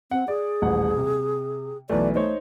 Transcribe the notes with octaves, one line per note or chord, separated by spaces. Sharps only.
C4 F#5
G#4 D5
D#1 A1 F#5
C3
B1 E3 A3 D5
A3 D#4 C5 C#5